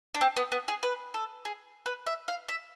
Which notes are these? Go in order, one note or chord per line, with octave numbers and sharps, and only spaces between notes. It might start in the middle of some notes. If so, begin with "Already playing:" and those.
D4
C4
B3
B3
G#4
B4
A4
G#4
B4
E5
F5
E5